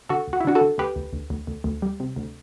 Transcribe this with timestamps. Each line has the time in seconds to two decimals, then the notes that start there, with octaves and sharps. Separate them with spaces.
0.09 D3 F#4 A4
0.27 D2
0.33 F#4
0.40 E4
0.45 D3 D4 F#4
0.55 F#4 A4
0.61 D3
0.78 D2 G4 B4
0.96 D2
1.13 D2
1.30 D2
1.47 D2
1.64 D2
1.82 G3
2.00 C3
2.16 D2